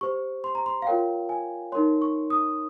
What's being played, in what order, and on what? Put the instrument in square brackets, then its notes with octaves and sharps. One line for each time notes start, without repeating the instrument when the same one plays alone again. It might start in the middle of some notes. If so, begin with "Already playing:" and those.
[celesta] G4 C5 C#6
C6
A#5
C6
F5
F4 A#4 C#5 G5
G#5
D#4 A#4 C#5 C6
C#6
D#6